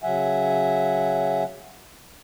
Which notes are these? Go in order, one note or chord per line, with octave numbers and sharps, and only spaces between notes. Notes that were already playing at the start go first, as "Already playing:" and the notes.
C#3 F#3 E5 F#5 G#5